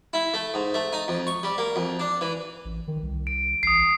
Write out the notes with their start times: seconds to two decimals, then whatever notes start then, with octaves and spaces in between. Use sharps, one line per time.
0.13 E4
0.34 A3
0.54 G#2
0.74 A3
0.93 D#4
1.08 F2
1.27 C#6
1.43 G3
1.58 A#3
1.76 F2
2.00 D4
2.21 E3
2.65 A1
2.88 D#3
3.02 C2
3.27 D7
3.63 A1 D#6 C7